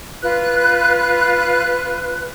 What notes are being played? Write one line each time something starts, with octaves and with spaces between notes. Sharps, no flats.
F4 B4 F#6